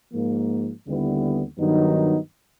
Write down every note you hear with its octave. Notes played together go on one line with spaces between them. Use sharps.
G#2 F3 A#3
D#2 D3 G3 B3 E4
G2 D#3 F#3 B3 D#4